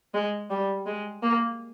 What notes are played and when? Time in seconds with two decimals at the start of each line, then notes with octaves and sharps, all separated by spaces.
0.14 G#3
0.50 G3
0.86 G#3
1.23 A#3